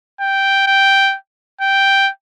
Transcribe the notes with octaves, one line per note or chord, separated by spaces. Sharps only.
G5
G5
G5